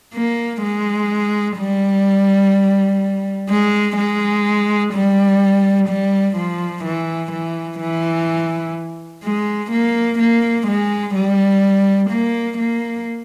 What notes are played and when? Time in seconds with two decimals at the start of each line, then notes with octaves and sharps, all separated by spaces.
0.14 A#3
0.62 G#3
1.58 G3
3.50 G#3
3.97 G#3
4.93 G3
5.89 G3
6.37 F3
6.84 E3
7.32 E3
7.80 E3
9.23 G#3
9.71 A#3
10.19 A#3
10.67 G#3
11.15 G3
12.11 A#3
12.58 A#3